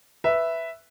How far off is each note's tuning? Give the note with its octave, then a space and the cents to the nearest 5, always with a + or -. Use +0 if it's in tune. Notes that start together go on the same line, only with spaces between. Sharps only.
B4 +0 E5 +0